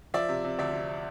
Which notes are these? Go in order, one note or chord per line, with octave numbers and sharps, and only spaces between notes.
F3 D5 E5
C3
C3
D2 D5 E5
C3